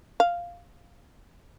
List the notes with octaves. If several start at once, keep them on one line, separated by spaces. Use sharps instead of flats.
F5